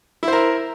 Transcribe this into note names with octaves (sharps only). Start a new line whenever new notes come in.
E4 A#4 C5